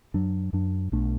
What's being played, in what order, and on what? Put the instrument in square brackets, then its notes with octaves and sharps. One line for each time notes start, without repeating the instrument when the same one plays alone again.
[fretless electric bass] F#2 F#3 D4
F#2 F#3 D4
B1 B2 A3 D4